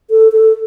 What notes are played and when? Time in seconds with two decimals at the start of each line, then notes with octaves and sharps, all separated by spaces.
0.10 A4
0.32 A4